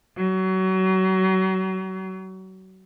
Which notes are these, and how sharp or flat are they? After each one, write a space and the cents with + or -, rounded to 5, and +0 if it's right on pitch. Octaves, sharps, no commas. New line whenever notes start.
F#3 +30